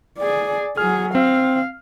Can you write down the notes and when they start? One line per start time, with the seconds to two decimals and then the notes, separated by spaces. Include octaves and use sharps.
0.18 G#4 D5
0.77 F#3 G#4 F6
1.15 C4 F5